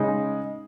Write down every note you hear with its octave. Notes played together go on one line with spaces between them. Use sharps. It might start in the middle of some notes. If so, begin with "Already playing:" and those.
Already playing: C#3 G#3 D#4